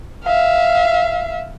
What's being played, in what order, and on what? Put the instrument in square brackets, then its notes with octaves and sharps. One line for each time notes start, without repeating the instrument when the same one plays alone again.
[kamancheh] E5 F5